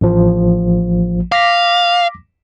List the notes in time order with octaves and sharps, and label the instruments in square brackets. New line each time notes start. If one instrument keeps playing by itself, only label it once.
[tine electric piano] A1 F3
[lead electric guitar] F5 [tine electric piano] D6 A#6 B6